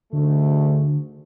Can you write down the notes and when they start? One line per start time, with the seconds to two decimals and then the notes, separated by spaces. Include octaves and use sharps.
0.13 D2 G#2 D3 A3